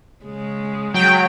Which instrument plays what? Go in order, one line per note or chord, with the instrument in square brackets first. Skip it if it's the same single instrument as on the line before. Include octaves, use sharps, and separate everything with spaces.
[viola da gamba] C#3 G#3
[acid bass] F#3 [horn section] G5